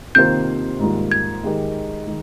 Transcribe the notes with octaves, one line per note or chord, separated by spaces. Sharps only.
C3 D#3 A#3 F4 C5 G6
G#2 D#3 G3 A#3 F4
G#6
D#3 G#3 D#4 G4 A#4
D#3 G#3